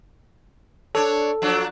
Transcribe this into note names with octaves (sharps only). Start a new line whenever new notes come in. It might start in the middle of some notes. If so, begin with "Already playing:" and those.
D4 A4 C#5
F3 F#3 D4